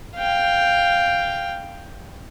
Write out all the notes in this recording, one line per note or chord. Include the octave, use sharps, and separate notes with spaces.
F5 G5